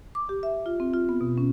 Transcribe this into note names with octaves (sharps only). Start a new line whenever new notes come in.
D6
G4
E5
F4
C4
F4
B3
B2
C#4